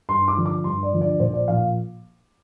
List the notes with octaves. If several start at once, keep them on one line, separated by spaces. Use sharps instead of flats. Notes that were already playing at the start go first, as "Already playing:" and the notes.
G2 C6
D6
D3 F3 D4
D6
G2 C6
D5
D3 F3 D4
D5
A#1 C5
D5
A#2 F3 A#3 F5